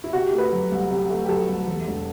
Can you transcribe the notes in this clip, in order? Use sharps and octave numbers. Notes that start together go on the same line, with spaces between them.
E4
C3 F#4
G4
A3
B4
F#3
C2
C3
A3
G4
F#3 A4
C2
E2
E1